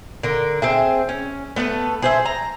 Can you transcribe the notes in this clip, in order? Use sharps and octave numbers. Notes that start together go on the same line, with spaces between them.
D3 A#4
C4 G#4 E5
C#4
A3 B3 A4 B4
G#4 C5 E5
A#5